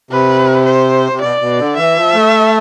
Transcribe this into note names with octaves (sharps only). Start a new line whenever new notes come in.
C3 B4
C5
C3
B2 D5
B2
D3
E3 E5
F3
A3